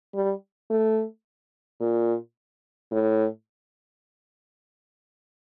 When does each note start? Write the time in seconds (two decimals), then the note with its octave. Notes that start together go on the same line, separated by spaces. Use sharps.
0.14 G3
0.70 A3
1.80 A#2
2.92 A2